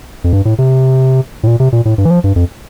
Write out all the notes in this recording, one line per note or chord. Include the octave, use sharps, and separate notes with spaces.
F2
G2
A2
C3
A2
A#2
C3
A#2
A2
G2
E3
F3
G2
F2